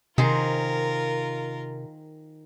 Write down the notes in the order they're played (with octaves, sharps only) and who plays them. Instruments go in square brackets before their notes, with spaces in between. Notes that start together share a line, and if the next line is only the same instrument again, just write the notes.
[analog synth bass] C3 [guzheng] D#3 G#4 C5 [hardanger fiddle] F4 A#4